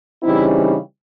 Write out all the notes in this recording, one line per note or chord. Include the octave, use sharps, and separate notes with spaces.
C#3 E3 G3 C4 D#4 E4